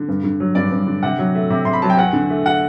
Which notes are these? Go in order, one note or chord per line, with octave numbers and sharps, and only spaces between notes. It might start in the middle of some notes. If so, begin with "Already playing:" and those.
Already playing: D3
G2
D3
F#3
G2 D5
G2
D3
C3 F#5
F#3
A3
C3
C3 C6
B5
F#3 A5
G5
E2 F#5
D3
A3
F#5